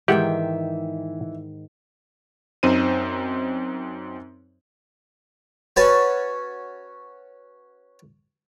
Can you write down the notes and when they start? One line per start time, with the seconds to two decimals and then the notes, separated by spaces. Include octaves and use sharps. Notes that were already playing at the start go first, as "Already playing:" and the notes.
0.08 G#2 D#3 E3 G4 E5 F#5 G5
2.63 F#2 C4 D#4 C5 D#7
5.76 C#4 F#4 B4 C#5 A5